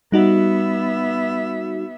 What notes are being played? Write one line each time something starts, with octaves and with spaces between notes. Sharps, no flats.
G3 B3 D#4 F#4 E5